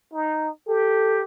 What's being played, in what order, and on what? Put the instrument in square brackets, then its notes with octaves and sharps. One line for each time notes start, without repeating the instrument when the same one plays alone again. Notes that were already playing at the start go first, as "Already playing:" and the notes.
[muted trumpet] D#4
[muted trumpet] G4 [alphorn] A4